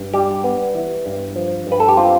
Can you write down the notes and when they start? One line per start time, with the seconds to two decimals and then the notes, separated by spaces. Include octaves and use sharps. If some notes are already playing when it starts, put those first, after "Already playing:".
Already playing: G2
0.13 G3 G4
0.44 B3
0.75 E3
1.06 G2
1.36 F3
1.67 G2 B4
1.80 A4
1.89 G4
1.97 C4 F4